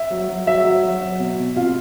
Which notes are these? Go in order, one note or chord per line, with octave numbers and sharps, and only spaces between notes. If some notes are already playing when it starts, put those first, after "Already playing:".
Already playing: E5
F#3
F#3
F#3 E5
F#3
F#3
F#3
B2
B2
C3 F4 F5